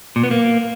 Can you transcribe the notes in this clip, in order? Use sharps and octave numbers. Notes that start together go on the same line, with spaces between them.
A#2
B3
A#3